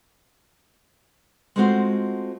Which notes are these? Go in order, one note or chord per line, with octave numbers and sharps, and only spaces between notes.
G#3 A3 C4 F4 F#4 C5